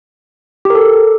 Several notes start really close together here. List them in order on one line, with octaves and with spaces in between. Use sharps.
G4 A#4 A4